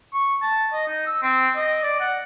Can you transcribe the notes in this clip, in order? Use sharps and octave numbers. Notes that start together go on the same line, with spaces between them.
C#6
A5
D#5
D#4
E6
C4
D#5
D5
F#5